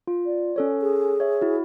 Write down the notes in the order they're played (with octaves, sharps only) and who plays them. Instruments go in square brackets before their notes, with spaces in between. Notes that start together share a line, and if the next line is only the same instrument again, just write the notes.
[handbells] F4
[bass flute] D5
[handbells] C#4 A4 C#5
[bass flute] G#4
[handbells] C#5 E5
E4 F#4